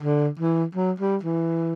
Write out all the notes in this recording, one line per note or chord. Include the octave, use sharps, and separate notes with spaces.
D3
E3
F#3
G3
E3